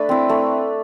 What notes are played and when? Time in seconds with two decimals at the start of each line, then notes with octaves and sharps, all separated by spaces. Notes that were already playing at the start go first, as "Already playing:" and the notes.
Already playing: A3 D4 B4 D5
0.09 C4 E4
0.29 A3